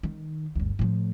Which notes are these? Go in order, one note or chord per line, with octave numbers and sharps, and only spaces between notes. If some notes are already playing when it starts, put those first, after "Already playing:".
D#3
G1 D2
A2 F3